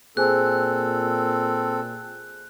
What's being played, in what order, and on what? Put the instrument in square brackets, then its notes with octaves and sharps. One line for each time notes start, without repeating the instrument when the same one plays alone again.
[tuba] A#2 [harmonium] C4 A4 [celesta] G#4 C5 G#5 [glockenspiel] F#6